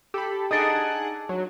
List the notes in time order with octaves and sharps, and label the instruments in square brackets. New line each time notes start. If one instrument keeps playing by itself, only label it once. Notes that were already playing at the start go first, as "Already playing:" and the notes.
[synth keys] G4 B5 [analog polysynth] A4
[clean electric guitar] D4 A4 [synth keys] D#4 D#5 [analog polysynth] G#4 F#5
[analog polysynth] F#3